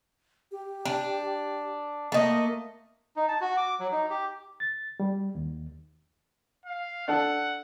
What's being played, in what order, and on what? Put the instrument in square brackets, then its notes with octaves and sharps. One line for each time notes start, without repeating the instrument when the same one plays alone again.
[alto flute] G4
[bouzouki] D4
[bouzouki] A3 D#5 [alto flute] A#3
[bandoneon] D#4
A5
F#4
D6
F#3
D#4
G4
[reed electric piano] A6
G3
D#2
[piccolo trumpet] F5
[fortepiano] D4 A4 [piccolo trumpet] F#5